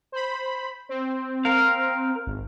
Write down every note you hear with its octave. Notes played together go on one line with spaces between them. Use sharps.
C5 B5
C4
A#4 F5
G#1